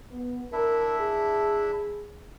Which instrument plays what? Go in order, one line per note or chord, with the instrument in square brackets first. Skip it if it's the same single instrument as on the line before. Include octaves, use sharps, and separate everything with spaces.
[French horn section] B3
[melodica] D4 E4 E5 [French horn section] A#4
[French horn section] G#4